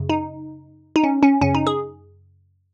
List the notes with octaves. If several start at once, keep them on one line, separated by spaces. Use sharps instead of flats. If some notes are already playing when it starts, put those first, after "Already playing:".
Already playing: F#2 C#3
D#4
D#4
C#4
C#4
F#2 C#3 C#4
D#4
G#4